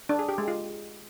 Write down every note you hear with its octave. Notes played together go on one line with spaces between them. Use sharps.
D4
G#4
G4
G#3
F4